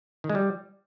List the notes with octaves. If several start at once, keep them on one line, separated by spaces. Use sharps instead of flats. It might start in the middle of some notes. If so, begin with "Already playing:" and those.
D#3
G#3
G3